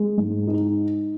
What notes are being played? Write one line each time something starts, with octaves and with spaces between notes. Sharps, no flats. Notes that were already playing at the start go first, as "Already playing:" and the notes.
Already playing: G#3
G#2
D#4